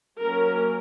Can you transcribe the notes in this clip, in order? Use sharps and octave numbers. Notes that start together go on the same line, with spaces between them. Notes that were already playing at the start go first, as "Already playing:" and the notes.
F#3 A#3 C#4 A#4